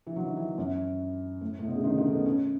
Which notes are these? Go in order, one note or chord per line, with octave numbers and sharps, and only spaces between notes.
E3
F#3
D#3
E3
F#2
A2
A2
B2
C#3
D#3
D#3
A3
B3
C#4